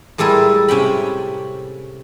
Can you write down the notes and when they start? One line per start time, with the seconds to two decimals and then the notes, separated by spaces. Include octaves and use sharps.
0.18 A2 G3 G#3 E4 A4 A#4
0.68 C3 C#4 G5 B5